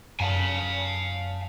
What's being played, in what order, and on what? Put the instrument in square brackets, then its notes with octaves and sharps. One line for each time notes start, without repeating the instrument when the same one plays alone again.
[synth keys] F#2 A5 [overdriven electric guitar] F5 G#5